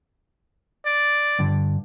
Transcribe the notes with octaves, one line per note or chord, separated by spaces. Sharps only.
D5
G2 D3